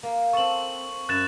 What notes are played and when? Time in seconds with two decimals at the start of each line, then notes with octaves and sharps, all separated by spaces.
0.03 A#3
0.33 C4 A4 C#6 F#7
1.09 F#2 F#6 A6 E7